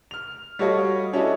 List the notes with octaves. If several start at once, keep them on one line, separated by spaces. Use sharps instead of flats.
F6 F7
G3 F#4 A4 C#5 D#5 F5
F#3 C#4 D4 E4 A4 D#5